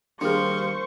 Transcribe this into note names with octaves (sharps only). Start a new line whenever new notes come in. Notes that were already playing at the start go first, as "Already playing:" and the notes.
D#2 F3 G3 D4 G#4 A#4 C5 C#6